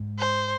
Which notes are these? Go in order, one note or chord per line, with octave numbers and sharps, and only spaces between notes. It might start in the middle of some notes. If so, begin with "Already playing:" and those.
Already playing: G#2
C5